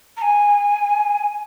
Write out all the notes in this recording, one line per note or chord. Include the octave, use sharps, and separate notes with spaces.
A#5
G#5